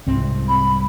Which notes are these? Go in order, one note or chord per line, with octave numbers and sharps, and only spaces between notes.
C2 G#2 C4
B5